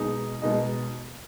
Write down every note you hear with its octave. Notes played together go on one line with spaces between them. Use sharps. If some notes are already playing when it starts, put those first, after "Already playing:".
Already playing: B2 G#3 D#4 G#4 D#5
B2 G#3 D#4 G#4 D#5